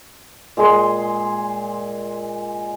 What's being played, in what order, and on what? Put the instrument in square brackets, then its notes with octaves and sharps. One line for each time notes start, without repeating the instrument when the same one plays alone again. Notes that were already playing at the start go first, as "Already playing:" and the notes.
[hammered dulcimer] A#2 G#3 G#4 C6